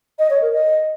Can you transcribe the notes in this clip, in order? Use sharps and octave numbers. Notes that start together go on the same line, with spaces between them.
D#5
C#5
A#4
D#5